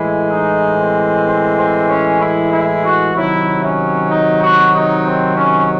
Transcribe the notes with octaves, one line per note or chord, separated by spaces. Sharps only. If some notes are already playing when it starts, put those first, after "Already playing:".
Already playing: A2 E3 G#3 E4
D#4
C4
C4
C4
C#4
E4
E4
F#4
C3 D#3 F#3 E4
C#4
D#4
F#4
D#4
C4
C#4